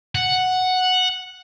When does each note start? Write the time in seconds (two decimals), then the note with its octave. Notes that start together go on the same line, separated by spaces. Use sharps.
0.15 F#5